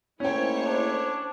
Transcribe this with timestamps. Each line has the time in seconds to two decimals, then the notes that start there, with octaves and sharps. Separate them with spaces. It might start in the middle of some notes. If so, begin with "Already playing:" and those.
0.20 G#2 A3 A#3 C#4 E4 C5 C#5 G5
0.65 D4